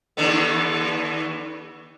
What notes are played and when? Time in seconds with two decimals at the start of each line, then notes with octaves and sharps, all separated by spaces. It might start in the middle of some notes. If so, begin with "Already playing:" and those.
0.17 D#2 D3 B3